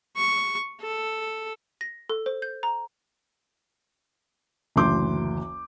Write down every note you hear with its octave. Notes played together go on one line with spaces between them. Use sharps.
C#6
A4
A#6
A4
C5
G6
A#5
F#1 D2 E3 C6 D6 G6